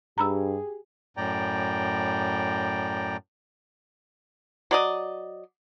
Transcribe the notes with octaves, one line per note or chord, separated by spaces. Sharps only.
G2 G4 G#4 A#5 B5 E6
F#2 A2 D5 G5 A#5
F#3 D5 D#5